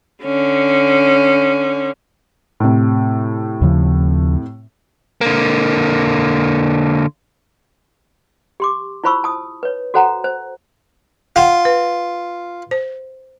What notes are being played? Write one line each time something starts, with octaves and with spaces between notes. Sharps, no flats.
D3 C#4
A2 C3
D#2 C#3 F3
D3 A#3
G4 C6 D6
E4 F4 C5 B5 C#6 E6
A5 D#6
B4 C#5
F#4 A4 C5 F#5 A#5
C5
F4 F#5 G5
B4
C5